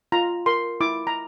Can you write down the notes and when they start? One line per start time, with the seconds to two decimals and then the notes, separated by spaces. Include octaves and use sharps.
0.12 F4 A#5
0.46 A#4 C6
0.81 E4 D6
1.07 A#5